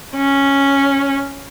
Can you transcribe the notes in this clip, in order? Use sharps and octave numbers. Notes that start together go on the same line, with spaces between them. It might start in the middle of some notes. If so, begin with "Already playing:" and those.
C#4